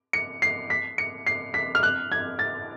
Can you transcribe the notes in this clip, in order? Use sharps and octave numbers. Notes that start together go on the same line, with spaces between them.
C#7
C7
B6
C#7
C7
B6
F6
F#6
G#6
A6